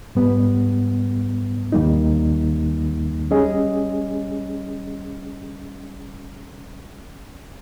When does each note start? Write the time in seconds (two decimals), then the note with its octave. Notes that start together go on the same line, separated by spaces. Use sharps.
0.15 G#2 G3 B3
1.72 D#2 D#3 G3 A#3 D#4
3.31 G3 C#4 G#4 D#5